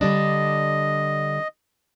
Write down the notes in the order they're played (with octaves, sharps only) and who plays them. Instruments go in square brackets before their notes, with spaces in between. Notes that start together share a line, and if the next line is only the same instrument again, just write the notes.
[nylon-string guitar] D3 G3 D4 [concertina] D#5